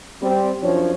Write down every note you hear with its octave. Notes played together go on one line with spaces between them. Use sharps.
G3 C4
F#2 F3 D4 C#5